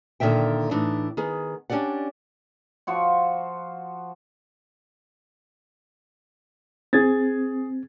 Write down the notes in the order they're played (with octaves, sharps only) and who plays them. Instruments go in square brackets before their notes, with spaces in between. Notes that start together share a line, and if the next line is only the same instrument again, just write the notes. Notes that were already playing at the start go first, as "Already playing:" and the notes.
[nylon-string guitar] A#2 D3 D#3 E5 G5
A2 E3 D4 D#4
D#3 B3 G#4
C#4 D4 G4 D5 F#5
[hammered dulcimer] F3 F#4 C#6
[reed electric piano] C4 [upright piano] G#4 G#6 A6